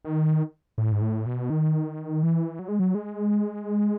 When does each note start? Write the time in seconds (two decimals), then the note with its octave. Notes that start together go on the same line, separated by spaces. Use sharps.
0.05 D#3
0.78 A2
0.92 G#2
1.01 A2
1.26 B2
1.50 D#3
2.23 E3
2.59 F#3
2.68 G#3
2.79 F#3
2.95 G#3